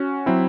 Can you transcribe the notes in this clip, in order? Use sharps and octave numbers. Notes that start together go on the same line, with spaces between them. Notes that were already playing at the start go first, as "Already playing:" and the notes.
Already playing: C#4 F#4
F#3 C4 E4